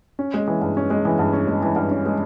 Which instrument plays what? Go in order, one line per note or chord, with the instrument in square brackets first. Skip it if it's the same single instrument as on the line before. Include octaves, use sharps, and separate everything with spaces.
[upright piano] C#4
G#3
E3
G2
C#4
G#3
E3
G2
C#4
G#3
E3
G2
C#4
G#3